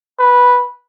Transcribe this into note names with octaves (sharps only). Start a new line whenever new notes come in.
B4